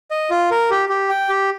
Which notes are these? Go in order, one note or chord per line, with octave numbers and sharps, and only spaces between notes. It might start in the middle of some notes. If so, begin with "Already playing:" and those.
D#5
F4
A#4
G4
G4
G5
G4